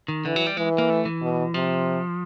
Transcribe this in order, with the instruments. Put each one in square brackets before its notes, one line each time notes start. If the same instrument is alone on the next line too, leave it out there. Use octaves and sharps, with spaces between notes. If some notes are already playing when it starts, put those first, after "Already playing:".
[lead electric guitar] D#3
[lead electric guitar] D3 [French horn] E3
[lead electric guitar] F#3
G3
[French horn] E3 [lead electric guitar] G#3
[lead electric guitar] A#3
A3
E3
[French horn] B2
[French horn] C3 [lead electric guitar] F3